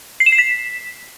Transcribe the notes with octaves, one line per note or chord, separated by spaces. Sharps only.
C7
E7
C7
B6